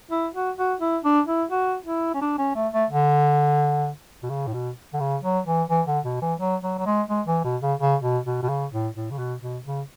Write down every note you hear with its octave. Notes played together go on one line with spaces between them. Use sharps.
E4
F#4
F#4
E4
D4
E4
F#4
E4
C#4
D4
C#4
A3
A3
D3
B2
C#3
A2
B2
D3
C#3
F#3
E3
E3
D3
B2
E3
F#3
F#3
F#3
G#3
G#3
E3
B2
C#3
C#3
B2
B2
B2
C#3
A2
A2
C#3
B2
B2
C#3